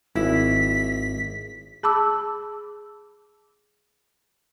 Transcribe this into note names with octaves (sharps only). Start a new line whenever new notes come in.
G#1 E4 B6
G#4 A5 B5 D6 E6